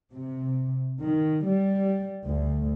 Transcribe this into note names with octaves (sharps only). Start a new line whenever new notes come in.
C3
D#3
G3
D2